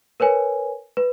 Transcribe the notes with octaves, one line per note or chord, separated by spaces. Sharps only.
A#4 B4 C#5 G#5
B4